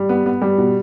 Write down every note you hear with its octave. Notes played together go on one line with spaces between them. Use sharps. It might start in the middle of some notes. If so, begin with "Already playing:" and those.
Already playing: G3
B3
B3
G3
B2